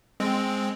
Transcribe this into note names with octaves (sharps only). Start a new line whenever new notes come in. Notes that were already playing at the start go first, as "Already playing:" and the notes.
G#3 C4